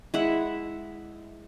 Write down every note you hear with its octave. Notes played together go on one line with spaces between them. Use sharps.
G#3 E4 E5 F#5